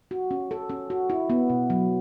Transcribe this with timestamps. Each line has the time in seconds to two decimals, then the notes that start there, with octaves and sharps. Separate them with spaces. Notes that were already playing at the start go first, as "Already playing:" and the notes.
0.11 F#4
0.31 C#4
0.51 A4
0.70 C#4
0.90 F#4
1.10 E4
1.30 B3
1.50 B2
1.70 F#3